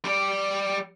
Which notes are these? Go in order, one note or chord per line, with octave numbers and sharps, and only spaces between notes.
G3 D5